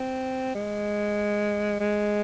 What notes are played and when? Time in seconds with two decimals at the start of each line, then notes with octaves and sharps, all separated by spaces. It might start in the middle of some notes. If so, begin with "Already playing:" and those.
Already playing: C4
0.55 G#3
1.80 G#3